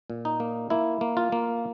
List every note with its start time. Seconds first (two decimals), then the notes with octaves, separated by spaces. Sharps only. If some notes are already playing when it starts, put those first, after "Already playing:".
0.10 A#2
0.25 D#4
0.40 A#3
0.70 A#3 E4
1.01 A#3
1.17 F4
1.32 A#3